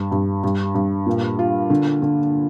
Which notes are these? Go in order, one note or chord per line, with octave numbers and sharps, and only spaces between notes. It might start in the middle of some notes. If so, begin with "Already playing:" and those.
Already playing: G2
G2
G2
G2
A#2
F4
D3
D3